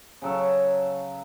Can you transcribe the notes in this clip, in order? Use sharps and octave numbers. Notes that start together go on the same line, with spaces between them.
C#3 F#3 A4